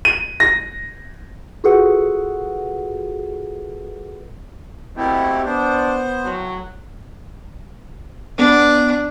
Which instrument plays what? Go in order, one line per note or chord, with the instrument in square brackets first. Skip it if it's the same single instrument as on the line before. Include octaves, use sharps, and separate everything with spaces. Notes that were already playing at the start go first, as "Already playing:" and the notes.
[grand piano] D#7
A#6
[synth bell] F4 F#4 G#4 A4 B4 F#5
[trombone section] B2 A3 A#3 [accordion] C4 E4 G4
[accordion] B3 C5 [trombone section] D4
[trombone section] A2 F#3
[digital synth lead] B3 [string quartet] D4